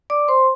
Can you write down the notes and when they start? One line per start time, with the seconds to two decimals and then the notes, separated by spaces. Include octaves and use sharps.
0.10 D5 D6
0.28 C5 C6